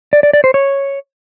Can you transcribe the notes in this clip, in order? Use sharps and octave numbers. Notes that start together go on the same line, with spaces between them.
D5
D5
D5
C5
C#5